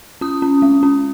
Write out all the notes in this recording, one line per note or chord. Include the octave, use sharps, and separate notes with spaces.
C#4 D#6
C#4
G#3
C#4